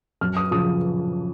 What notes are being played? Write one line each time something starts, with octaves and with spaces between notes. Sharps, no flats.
F#2 F6
D#6
C#3 F3 D#6